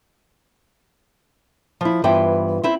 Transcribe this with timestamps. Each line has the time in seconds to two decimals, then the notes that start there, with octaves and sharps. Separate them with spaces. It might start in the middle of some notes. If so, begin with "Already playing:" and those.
1.81 F3 E4
2.04 G2 E3 B3 F4 C5 G5
2.63 C4 E4 C5